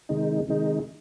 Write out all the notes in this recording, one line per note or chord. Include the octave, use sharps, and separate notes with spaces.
C3 D#3 G#3 D#4
C3 D#3 G#3 D#4